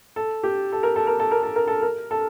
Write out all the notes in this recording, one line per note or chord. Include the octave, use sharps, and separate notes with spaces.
A4
G4
A4
A#4
A4
A#4
A4
A#4
A4
A#4
A4
A#4
A4